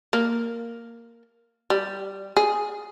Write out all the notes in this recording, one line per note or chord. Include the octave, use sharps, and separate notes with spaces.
A#3
G3
G#4